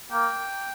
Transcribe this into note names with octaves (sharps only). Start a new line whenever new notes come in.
A#3 G5